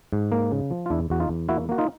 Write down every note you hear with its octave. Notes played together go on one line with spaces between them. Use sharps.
G#2
A#3
C#3
F3
F4
E2 D4 E4
E2 F#4
D#4 F4
E2
A#3 E4 F#4
A#3 F#4
D#4 F4